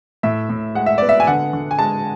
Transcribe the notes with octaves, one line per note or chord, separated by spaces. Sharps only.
A2 E5
A2
G#3 F#5
E5
B3 D5
E5
G#5
D3 F#5
D3
G#5
G#3 A5